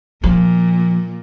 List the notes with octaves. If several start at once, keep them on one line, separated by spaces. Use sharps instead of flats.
A#2 F3